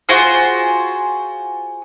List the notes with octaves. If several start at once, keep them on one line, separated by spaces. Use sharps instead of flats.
F4 F#4 G#4 C5